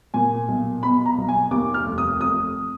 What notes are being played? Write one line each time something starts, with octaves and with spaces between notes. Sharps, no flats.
A#2 G#5
B1
B2 B5
A#5
B1
G#5
D#2 D6
F6
F1
D#6
F2 D#6